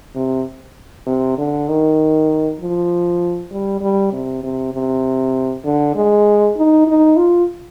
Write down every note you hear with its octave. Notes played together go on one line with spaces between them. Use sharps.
C3
C3
D3
D#3
F3
G3
G3
C3
C3
C3
D3
G#3
D#4
D#4
F4